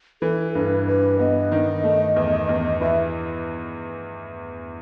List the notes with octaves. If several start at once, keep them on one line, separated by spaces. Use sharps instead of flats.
E3 A4
G2 B4
G2 B4
B3 D#5
D#3
A3
E2
E2
E3 E5